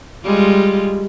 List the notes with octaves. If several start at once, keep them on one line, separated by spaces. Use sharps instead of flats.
G3 G#3 F4